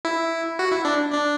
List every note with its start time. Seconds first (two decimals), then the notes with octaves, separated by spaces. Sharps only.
0.05 E4
0.59 F#4
0.72 E4
0.85 D4
1.12 D4